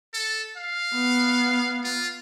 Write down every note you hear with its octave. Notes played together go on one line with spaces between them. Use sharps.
A4
F5
B3
F4